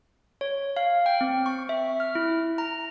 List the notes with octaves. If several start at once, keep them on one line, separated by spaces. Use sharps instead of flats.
C#5
F5
G5
C4
C#6
E5
F6
E4
A#5